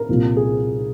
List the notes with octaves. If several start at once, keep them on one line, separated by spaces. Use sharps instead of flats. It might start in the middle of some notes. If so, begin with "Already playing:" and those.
Already playing: A#4
C2 A#2 F3
G#4